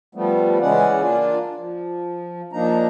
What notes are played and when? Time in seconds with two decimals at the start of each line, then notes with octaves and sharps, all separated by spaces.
0.15 F3 G3 A3 B3
0.61 C#3 E3 G#3 C#4 D5 F#5
1.02 A#3 D4 F4 D5
1.57 F3
2.53 A#2 F3 A#3 D4 D#4 A#5